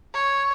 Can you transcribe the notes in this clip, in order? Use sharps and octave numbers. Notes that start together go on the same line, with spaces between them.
C#5